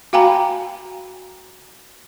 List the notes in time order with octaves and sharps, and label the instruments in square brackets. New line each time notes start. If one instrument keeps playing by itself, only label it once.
[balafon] F#4 F5 G5 G#5 A#5 B5